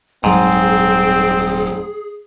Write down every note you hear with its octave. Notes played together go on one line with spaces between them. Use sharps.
D#1 G#2 F#3 G3 C4 G#4